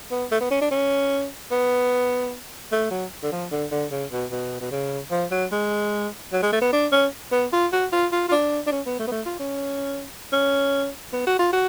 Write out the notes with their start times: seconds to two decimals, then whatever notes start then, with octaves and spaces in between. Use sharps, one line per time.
0.11 B3
0.31 A3
0.41 B3
0.51 C#4
0.61 D4
0.71 C#4
1.51 B3
2.72 A3
2.91 F#3
3.23 D3
3.32 F3
3.51 D3
3.72 D3
3.91 C#3
4.12 B2
4.31 B2
4.60 B2
4.71 C#3
5.11 F3
5.31 F#3
5.52 G#3
6.33 F#3
6.43 G#3
6.52 A3
6.61 B3
6.73 D4
6.92 C#4
7.32 B3
7.52 F4
7.72 F#4
7.92 F4
8.12 F4
8.28 F4
8.32 D4
8.67 D4
8.72 C#4
8.86 B3
8.99 A3
9.07 B3
9.12 A3
9.26 F4
9.39 C#4
10.32 C#4
11.13 B3
11.27 F#4
11.39 F4
11.53 F#4